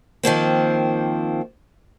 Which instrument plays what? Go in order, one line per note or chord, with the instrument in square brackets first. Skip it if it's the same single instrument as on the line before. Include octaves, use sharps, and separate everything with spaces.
[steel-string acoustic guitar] D#3 F3 A#3 C4